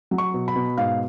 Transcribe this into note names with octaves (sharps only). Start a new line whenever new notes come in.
F#3
C#6
B2
B5
B2
G#2 F5